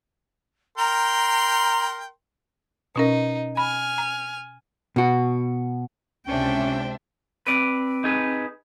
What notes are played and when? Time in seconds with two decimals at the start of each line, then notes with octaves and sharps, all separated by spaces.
0.78 A#4 G5 A#5 C6
2.96 B2 C#4 D#4 A#4
3.57 G#5 B5 F6
3.98 A#5
4.96 B2 F#4
6.28 C#2 C3 C#4 D4 C5 E5 G5
7.47 C4 B4 D5
8.04 D#4 G#4 B4